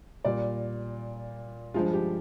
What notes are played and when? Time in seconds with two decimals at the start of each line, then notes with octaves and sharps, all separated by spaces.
0.24 A#2 G3 D5
1.74 G2 F3 G#3 F4
1.93 G4